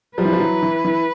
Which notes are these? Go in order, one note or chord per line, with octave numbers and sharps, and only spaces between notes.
F3 G3 B4
E3
F3
E3 F#3
E3
E3